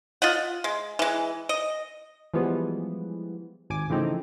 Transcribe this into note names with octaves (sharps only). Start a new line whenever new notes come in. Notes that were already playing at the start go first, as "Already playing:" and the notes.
F4 D#5 F#5
G#3
E3 G#3
D#5
E3 F3 G3 G#3 B3
G#1 G#5 D6
C#3 E3 F3 A3 C4 D#4